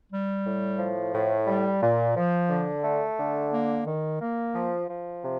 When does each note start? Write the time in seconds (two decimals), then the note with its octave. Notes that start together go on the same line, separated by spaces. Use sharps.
0.11 G3
0.45 A2
0.78 F3
1.13 A2
1.46 G3
1.82 A#2
2.16 F3
2.49 D3
2.83 A3
3.18 D3
3.51 A#3
3.86 D#3
4.21 A#3
4.54 F3
4.88 F3
5.23 C3